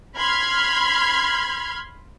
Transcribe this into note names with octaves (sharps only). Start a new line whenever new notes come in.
B5 C6 F6 G#6